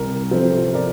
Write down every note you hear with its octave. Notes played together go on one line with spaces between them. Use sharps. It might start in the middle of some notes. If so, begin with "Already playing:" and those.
Already playing: C2 A#4
C3 F3 A4 C5
A#4 D5